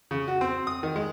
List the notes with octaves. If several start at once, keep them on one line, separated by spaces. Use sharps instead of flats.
C#3
F#4
C4
D#6
D#3
G#3